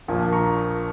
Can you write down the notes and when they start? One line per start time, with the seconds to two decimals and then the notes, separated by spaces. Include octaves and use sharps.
0.08 A#1 A#2 F3 A#3
0.32 A#5 C#6